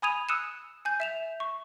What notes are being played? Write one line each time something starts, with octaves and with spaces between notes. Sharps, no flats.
G#5 B5 D#6 G#6 D#7 F7
D#6 E6 F#6 C#7 D#7 E7
G#5 G6
E5 E7 F7
C#6